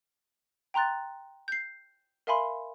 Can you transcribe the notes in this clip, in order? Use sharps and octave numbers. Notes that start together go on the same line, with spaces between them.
G5 A#5 C6 F#6 A6
G6 C7
A#4 E5 F5 G#5 B5 C6